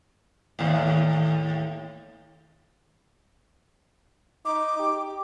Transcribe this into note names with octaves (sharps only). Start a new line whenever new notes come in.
D#2 A2
D#4 D6
G4